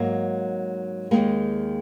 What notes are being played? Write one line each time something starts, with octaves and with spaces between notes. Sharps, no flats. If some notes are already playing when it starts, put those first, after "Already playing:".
Already playing: G#2 F#3 A#3
D#2 D#3 G#3 A#3